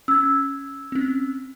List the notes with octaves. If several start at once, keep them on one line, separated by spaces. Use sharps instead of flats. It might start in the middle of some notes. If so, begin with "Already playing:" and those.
C#4 E6 G#6
C4 C#4